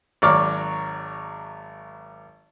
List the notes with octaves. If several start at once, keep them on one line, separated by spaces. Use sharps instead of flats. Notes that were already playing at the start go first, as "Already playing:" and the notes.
G#1 F#3 C#5 D5 D6 F6